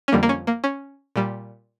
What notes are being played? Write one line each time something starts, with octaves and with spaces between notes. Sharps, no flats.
C#4
F2 D3 G3 A#3
A#3
C#4
A#3
C#4
A#2 G3